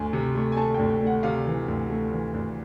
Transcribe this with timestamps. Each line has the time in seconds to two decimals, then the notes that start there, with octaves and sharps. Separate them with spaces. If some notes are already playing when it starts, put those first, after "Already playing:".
Already playing: D2 G#5
0.13 C3
0.35 A3
0.52 G#5
0.57 A3 A5
0.74 G5
0.79 D2
0.91 G5
1.02 A3
1.07 F#5
1.23 C3 F5
1.46 E3
1.68 D2
1.90 A3
2.12 E3
2.34 D2